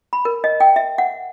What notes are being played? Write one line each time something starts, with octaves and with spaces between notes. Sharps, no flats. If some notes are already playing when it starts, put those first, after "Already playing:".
B5
A#4
D#5
G5
E5
F#5